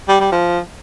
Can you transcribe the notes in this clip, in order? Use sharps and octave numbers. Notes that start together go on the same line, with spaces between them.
G3
G3
F3